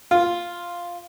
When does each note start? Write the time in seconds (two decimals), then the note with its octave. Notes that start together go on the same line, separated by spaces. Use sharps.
0.11 F4